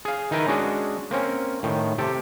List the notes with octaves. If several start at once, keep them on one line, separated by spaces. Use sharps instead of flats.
G#4 F5
D#3 D#4 E4 A#4 B4
G#3 C#4 D4 F#4 G#4
A#3 C4 C#4
A2 D#3
C3 G4 A4